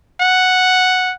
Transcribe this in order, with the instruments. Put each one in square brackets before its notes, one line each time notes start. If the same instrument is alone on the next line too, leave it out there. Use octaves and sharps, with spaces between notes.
[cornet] F#5